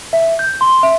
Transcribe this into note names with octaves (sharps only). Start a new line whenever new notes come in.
E5
G6
C6
E5